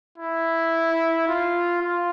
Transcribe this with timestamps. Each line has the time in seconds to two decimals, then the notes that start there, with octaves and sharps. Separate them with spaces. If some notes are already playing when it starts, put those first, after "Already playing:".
0.18 E4
1.28 F4
1.82 F4